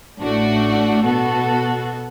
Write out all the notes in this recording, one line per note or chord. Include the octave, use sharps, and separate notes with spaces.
A1 A2 A3 D4 F#4
B2 B3 F#4 A4